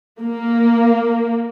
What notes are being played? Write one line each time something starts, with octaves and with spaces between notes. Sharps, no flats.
A#3